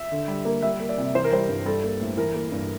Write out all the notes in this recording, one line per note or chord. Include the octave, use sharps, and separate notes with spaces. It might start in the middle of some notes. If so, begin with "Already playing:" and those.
Already playing: E5
D3
G3
A#3
G3 E5
A#3
D5
C3
E3 C5
A#4
G3 C5
G2
G3 A4
A#3
A2
E3 A#4
A#3
G2